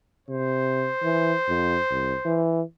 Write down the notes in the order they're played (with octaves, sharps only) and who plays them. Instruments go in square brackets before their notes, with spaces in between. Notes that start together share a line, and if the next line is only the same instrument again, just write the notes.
[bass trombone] C3 [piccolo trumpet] C5
[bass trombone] E3
F2
C2
E3